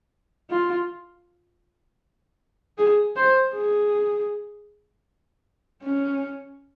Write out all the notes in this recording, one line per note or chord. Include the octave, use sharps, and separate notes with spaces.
F4
G#4
C5
G#4
C#4